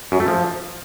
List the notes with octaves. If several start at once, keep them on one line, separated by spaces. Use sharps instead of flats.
F#2
A3
F3